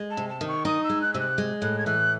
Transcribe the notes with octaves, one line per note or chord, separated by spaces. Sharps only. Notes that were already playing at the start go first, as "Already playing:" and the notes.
Already playing: G#3
A5
C3
A5
D#3
C#6
D#4 D#6
E6
G#3
F#6
C3 E6
F#6
G#3
A2 F#6
G#6
E3 F#6